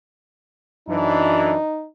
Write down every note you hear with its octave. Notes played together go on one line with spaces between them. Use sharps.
F#2 E3 D4 D#4